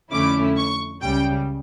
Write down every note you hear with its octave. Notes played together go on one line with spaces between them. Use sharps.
F2 D3 A3 C#4 E4 D6
C#6
C#2 C#3 G3 G5